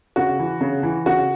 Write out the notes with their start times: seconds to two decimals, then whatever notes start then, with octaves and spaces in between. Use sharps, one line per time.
0.16 C#3 F#4
0.39 E3
0.61 C#3
0.83 E3
1.06 C#3 F#4